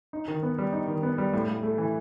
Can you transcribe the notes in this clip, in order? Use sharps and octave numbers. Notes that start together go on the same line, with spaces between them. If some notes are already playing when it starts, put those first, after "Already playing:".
D#4
D#3
B3
G3
D#4
D#3
B3
G3
A2
A2
A3
E3